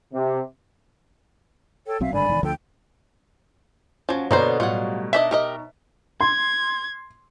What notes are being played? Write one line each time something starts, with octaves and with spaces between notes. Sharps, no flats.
C3
A4 C#5 G5
B1 F#3 C4 E5 F5
G#1 G2 D3 D5 G#5 B5
E1 D#3
D2 D3 F3 A4 G5
F3 F#3 C#4
B2 D3 A#3 B3 C5 C#5 A#5
A2 F#3 G3 F4 F#5
D#3 D4 D#5 E5
D#4 G4 A#4 D#5
C6 G#6